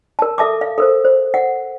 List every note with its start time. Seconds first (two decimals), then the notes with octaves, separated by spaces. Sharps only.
0.19 A#4 A5
0.38 A4 E5 A5 D6
0.61 F5
0.78 A4 A#4 C5
1.05 C5
1.34 F#5